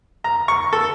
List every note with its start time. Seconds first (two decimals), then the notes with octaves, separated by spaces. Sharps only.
0.24 A#5
0.48 C#6
0.73 A4